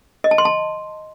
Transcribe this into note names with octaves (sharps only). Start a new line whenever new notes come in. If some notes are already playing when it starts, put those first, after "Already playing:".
D#5
A5
C6
A5